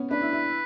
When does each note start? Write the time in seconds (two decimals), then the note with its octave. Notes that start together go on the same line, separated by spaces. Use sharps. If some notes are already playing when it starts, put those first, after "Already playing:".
Already playing: B3 C#4
0.11 D4 B4
0.22 E4
0.32 E4